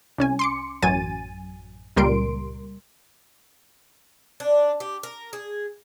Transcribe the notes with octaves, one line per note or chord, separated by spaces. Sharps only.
C2 C#4 G#5
C6 D6 C#7
A1 F#2 F#3 G#5 A6 D#7
C#2 A#2 G3 A#4 C6 D7
D4
G4
A#4
G#4